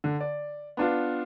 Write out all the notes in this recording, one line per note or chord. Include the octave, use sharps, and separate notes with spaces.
D3
D5
B3 D4 F4